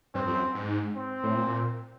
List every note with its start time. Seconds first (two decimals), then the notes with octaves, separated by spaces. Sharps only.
0.15 G2 C4
0.27 F2
0.35 F#2
0.54 G#2
0.95 C4
1.23 A2
1.36 A#2